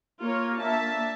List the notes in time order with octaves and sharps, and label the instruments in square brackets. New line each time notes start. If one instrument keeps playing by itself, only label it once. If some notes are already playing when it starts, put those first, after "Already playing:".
[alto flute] A#3 [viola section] F4 A#4 C#5
[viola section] D4 E5 A5